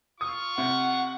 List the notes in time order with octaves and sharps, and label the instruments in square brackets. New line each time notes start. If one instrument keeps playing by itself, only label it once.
[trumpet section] F4 C#6 [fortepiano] D#6
[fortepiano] C3 [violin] F#5